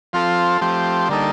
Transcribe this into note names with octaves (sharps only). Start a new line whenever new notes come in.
F3 C4 F4 A4
F3 A3 C4 G4
D3 G3 A#3 D#4 A4